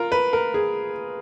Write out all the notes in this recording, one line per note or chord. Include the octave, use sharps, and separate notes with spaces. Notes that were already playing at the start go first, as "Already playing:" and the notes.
Already playing: F4 A#4
B4
A#4
G#4